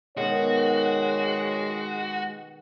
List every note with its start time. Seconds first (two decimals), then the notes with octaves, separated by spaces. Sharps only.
0.17 B2 D#3 G#3 F#4 C#5